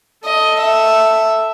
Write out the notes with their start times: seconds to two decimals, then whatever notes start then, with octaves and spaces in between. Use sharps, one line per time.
0.25 A4 D#5
0.61 E5